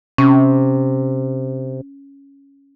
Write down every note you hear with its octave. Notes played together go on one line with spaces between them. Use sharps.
C3 C#4